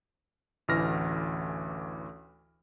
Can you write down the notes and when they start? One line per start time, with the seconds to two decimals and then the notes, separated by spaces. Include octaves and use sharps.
0.68 A1 D2 E3 F6 A#6